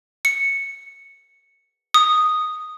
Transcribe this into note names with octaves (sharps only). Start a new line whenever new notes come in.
C#7
D#6